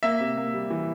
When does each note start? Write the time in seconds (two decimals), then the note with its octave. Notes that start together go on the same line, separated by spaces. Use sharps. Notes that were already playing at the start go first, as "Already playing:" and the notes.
0.03 A#3 E5
0.20 C3
0.37 A#3
0.54 G3
0.70 E3